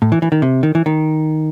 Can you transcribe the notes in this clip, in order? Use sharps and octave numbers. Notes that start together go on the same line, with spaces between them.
A2
E3
E3
D#3
C3
D#3
E3
D#3